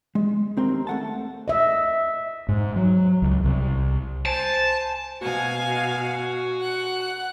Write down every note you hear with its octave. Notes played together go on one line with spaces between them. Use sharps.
G#3
D#2 C4 A#4 C6
A3 F#5 A5
D#5 E5
G#2
F#3
C#2
C2
C5 G#5 A5
B2 F#4 F5 G#5
F#5 F#6